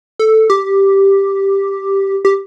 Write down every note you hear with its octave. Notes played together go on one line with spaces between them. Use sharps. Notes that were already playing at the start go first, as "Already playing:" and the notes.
A4
G4
G4